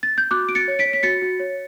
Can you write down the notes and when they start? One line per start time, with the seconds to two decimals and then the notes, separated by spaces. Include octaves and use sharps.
0.03 A6
0.18 G6
0.31 F#4 D6 F#6
0.49 F#4 D7
0.55 A6 C#7
0.68 C#5
0.79 B6 D7
0.85 C#5
0.93 B6
1.03 F#4 A6 C#7
1.22 F#4
1.39 C#5